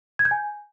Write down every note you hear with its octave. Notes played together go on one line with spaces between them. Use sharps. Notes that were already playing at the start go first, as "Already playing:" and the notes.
G#6
G6
G#5